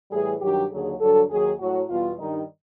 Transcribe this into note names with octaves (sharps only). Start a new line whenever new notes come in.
A2 E3 G3 G#4
G2 D#3 F#3 G4
D#2 D3 F#3 G#4
G2 D3 F#3 A4
D#2 D#3 F#3 G#4
A2 F#3 F#4
E2 B2 G3 F4
G2 D#3 G3 D#4